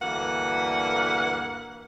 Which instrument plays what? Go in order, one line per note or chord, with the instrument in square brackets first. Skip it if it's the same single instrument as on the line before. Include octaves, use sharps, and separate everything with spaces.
[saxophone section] D2 G2 E3 A#3 F#5